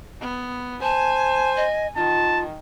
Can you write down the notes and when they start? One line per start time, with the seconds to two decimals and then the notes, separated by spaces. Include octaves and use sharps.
0.21 B3
0.82 C5 G#5 A5
1.57 D#5
1.96 D#3 F4 A5